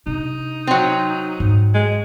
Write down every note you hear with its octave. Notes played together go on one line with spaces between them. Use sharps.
C3 D4 D#4
F#3 C4
G#2
G#3